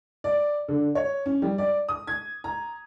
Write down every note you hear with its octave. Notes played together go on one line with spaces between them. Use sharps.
D5
D3
C#5
C#4
G3
D5
D#6
G#6
A#5